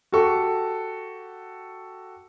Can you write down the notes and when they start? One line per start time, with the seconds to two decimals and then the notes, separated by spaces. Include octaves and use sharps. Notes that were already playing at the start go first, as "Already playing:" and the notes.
0.12 F#4 G4 A4 C#6